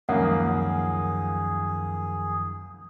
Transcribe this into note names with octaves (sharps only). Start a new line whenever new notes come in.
C#2 F#2 D#3 F3 A#3 G#4 F#5